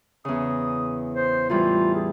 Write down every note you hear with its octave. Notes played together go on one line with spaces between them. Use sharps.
E2 C#3 D#6
C5
A2 E3 G3 F4
G#4